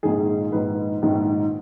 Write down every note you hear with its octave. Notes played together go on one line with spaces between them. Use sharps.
A#1 G#2 D#3 G#4
A#1 G#2 D#3 B4
A#1 G#2 D#3